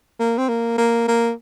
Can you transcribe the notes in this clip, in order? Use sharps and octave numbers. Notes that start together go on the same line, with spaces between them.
A#3
C4
A#3
A#3
A#3